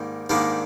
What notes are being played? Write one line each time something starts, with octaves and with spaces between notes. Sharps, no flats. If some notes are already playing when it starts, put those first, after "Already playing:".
Already playing: G#2 D#3 G3 A#3
G#2 D#3 G3 A#3 D4